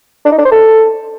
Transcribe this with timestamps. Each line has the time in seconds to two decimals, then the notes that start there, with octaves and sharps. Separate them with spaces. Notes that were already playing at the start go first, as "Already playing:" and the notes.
0.25 D4
0.32 D#4
0.38 D4
0.45 C5
0.51 A4